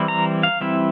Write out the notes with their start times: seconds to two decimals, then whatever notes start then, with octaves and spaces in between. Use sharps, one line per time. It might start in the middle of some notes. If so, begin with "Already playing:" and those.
Already playing: E3 G3 C4 E4
0.08 A#5
0.43 F5
0.61 E3 G3 C4 E4 E5